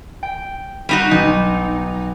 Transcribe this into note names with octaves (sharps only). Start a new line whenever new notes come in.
G5
G3 D#4 F#4
B1 D#4